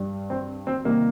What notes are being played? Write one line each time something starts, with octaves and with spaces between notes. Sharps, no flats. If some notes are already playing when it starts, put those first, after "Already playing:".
Already playing: G2 G3
C4
C4
C3 D#3 G3 A#3